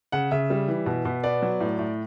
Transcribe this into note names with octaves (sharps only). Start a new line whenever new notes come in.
C#3 F#5
C#3 E5
G3
E3
B2
B2
B3 D5
F#3
A2
A2